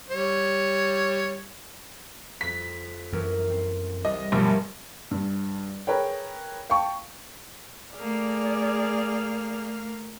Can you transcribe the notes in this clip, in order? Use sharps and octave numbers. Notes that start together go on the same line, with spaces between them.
G3 C#5
F2 B6
F#2 E3 A#3 A#4
C4
C2 D#5
A#1 G2 B2 F#3 A3 G4 A#4 C#5
G2
G#4 A#4 B4 C#5 G5
F5 G5 A5 C#6
A3 A#3 G#4 D5 F6